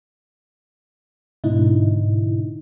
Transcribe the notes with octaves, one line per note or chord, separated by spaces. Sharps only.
G#2 B2 D3 D#4 E4